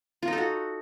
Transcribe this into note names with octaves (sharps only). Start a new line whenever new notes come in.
F4
D#4
A4
F#4